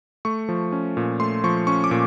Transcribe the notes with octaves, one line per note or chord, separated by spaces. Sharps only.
A3 C#6
F3
C#4
A#2
A3 C6
F3 C#6
C#4 C#6
D6
A#2